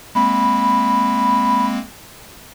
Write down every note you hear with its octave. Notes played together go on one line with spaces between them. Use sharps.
G#3 A#3 C4 B5